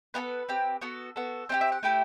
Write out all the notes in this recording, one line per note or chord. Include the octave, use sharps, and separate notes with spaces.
B3 F#4 A4 B4
C4 G4
B3 F#4 A4
B3 F#4 A4
C4 E4 G4 C5
E5
F#5
A3 E4 G4 G5